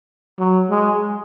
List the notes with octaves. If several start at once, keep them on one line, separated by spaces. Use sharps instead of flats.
F#3
G#3